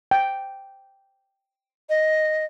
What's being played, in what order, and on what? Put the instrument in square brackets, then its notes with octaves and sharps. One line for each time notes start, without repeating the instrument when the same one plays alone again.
[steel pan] G5
[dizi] D#5